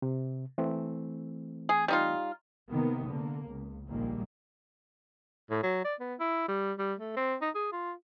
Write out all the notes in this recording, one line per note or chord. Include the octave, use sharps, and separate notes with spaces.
C3
E3 A3 C4
G#4
G3 D#4 F4
C3 D#3 A#3 B3
D3 A#3
C#2
A#1 A#2 D#3 G3 A#3
A2
F#3
D5
B3
E4
G3
G3
A3
C4
D#4
G#4
F4